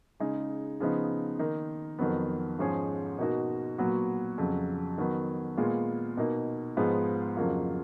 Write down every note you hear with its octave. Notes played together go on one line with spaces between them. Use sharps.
C#3 G#3 D#4 G#4
C#3 F3 B3 D#4
D#3 A#3 D#4
F2 D#3 F#3 B3
G#2 F3 G#3 C#4 G#4
B2 A#3 D#4 F#4
A#2 F#3 B3 F#4
F2 C#3 F#3
D#3 F#3 B3
A#2 G#3 B3 F4
B2 A#3 D#4
G#2 F3 G#3 B3 F4
F2 C#3 F#3 A#3 F4